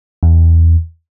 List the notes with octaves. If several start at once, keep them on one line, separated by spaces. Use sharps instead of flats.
E2